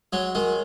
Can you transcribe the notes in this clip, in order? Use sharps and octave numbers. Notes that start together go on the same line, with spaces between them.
F#3 G#3
D#3 G#3